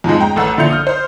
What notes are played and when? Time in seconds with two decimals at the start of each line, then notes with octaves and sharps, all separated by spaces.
0.04 F2 G#2 F3 G#3
0.19 G#3 G5 A#5
0.36 A1 A4 F#5 E6
0.58 A#1 D3 E4 G6 C#7 F7
0.71 D#6 F6
0.87 C5